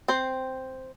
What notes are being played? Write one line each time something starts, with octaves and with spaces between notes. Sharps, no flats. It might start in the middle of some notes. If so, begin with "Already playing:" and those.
C4 C5